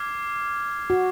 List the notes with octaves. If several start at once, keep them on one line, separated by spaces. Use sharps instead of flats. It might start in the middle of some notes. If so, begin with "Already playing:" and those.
Already playing: D6 F6 G#6 C7
F#4